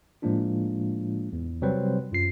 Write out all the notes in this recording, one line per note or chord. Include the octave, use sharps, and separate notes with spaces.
A2 F3 G#3 A#3 D4 F4
E2
C3 F#3 G3 C4 B4 C5
F#2 F4 C7